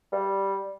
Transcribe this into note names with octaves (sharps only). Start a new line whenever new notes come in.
G3